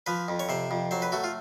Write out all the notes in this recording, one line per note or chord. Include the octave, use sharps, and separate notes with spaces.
F3 B4
F2
C#5
C3 C5
F2
F#3 C5
B4
A3 F#4
F4